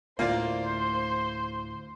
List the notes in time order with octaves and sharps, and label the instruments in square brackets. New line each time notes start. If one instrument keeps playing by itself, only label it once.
[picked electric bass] D2 A2 [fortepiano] A#3 F4 D5 [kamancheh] C5